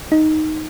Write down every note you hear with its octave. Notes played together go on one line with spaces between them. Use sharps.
D#4